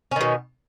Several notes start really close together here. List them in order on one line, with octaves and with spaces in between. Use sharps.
C#4 D#3 B2